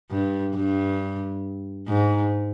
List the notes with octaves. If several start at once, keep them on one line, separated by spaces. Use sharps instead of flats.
G2
G2
G#2